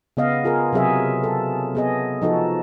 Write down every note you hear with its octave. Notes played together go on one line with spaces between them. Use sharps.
C#3 B3 D#5 F5
F4 G#4 A#4
C3 F#3 G#4 E5
A4
B3 G#4 D#5
F3 D#4 F#4 A4